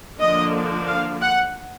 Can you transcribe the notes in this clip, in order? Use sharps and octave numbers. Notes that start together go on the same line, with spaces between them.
D3 F3 A#3 D4 D#5
F5
F#5